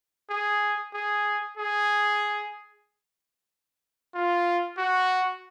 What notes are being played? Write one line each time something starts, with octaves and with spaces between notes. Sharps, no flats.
G#4
G#4
G#4
F4
F#4